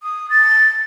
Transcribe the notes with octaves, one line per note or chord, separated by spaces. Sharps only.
D#6
A6